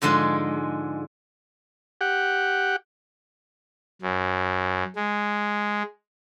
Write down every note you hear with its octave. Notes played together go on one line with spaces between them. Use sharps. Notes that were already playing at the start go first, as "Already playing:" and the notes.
G#2 D3 F3 G#3
G4 F#5
F#2
G#3